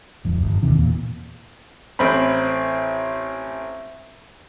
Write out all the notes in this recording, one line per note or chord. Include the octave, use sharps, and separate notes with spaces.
D1 F2
G1
D#2 C3 D#3
E2 A#2
A1 C4 B5